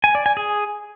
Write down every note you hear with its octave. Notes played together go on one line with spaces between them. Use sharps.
G#5
D5
G#5
G#4